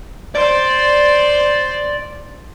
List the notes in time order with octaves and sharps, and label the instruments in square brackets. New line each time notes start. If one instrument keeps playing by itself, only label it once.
[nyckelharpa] C5 [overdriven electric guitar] D5